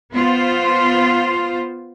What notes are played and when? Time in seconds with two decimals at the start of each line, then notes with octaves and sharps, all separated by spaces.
0.13 B3 F4 C5